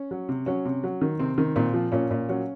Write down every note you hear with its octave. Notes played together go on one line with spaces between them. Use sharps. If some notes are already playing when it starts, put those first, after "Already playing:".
Already playing: C#4
F#3
C3
F#3 C#4
C3
F#3
D#3
C3 C4
D#3
A#2 C4
F3
A#2 C#4
A#2
F#3 C#4